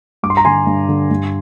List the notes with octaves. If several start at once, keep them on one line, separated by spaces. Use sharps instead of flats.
G2 D6
C6
A#5
D3 G#5 C6
G2
D3
G2